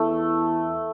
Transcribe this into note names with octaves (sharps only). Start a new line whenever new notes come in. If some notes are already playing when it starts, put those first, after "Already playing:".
Already playing: E2 A3